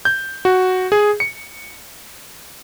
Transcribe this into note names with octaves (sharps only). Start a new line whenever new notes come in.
G6
F#4
G#4
C#7